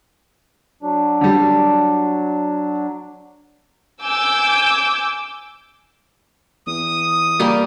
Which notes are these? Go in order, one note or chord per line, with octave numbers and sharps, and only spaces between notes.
F#3 D4
D3 G3
G#5 D6 E6 G6
E2 D#6
G3 A#3 G4